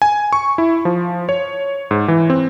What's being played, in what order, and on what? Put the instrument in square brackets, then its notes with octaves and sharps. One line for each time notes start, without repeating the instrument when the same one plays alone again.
[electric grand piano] G#5
C#6
E4
F3
C#5
G#2
E3
C4